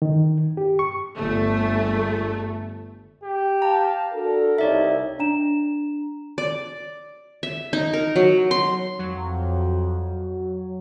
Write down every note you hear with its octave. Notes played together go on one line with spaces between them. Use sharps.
D#3
G4
C#6
G1 A3
G4
F5 A5 A#5
D4 F#4 A4 A#4
C2 D#4 C#5 D5 E5
D4 A#5 E7
D5
E5
D#4
A#4
F#3
C6
F2 F#3